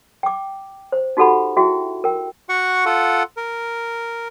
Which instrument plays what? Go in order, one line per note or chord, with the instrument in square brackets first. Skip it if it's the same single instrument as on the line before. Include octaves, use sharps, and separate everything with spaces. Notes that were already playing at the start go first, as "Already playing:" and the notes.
[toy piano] G5 D6
C5
D#4 F#4 G4 A4 F#5 B5
E4 F#4 G#4 E5 G5
A#4 G5
[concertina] F#4 F#5 C#6
F4 A4 F#5
A#4